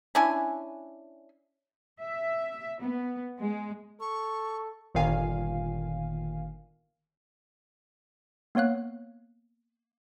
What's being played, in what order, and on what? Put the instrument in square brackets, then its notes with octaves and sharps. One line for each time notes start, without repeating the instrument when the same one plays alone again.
[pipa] C#4 D4 E4 G#5
[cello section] E5
B3
G#3
[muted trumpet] A4 [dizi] C#6
[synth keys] G1 A#2 D#3 F5 G#5
[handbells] A#3 B3 C#5 F5 F#6